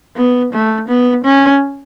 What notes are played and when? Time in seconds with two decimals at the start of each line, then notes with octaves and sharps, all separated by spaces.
0.17 B3
0.53 A3
0.88 B3
1.24 C#4